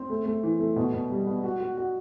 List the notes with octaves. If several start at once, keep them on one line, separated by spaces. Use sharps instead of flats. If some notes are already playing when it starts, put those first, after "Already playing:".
Already playing: C4
A3
A3
E3
A3
B2
B2
G3
B3
F#4
F#4
F#4